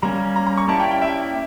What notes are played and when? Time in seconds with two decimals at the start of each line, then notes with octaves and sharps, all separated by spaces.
0.02 G3 A#3 C#4 A#5
0.36 A#5
0.47 A#5
0.57 C#6
0.68 A#3 C#4 E4 G4 D5 A5
0.80 G5
0.91 G5
1.01 E5